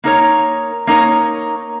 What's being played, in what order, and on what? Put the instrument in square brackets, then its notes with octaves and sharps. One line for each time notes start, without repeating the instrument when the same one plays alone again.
[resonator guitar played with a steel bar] A#3 D#4 A#4 C#5
A#3 D#4 A#4 C#5